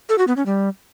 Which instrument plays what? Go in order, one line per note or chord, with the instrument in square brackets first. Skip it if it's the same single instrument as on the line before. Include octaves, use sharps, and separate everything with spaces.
[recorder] A4
F#4
B3
C#4
G3